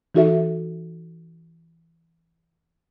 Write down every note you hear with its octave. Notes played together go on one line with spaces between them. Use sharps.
E3 D#4 F#4 A4 E5